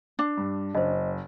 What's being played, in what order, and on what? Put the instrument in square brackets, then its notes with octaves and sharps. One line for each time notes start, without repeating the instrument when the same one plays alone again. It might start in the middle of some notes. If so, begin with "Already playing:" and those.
[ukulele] D4
[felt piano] G2
[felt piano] F#1 [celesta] C5 D#5